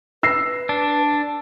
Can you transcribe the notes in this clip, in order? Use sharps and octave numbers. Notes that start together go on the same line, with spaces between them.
B4 E6 A#6 C7
D4